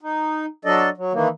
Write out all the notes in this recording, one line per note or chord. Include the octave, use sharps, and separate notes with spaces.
D#4
F#3 D4 A4 D5 D#5
F#3
D#3 E3 A#3